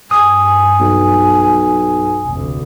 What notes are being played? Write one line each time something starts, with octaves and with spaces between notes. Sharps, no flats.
G2 G#5 D#6
B1
F1 D2